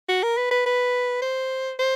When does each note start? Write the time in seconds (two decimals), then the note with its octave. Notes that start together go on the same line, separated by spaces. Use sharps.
0.09 F#4
0.23 A#4
0.37 B4
0.51 B4
0.66 B4
1.22 C5
1.79 C5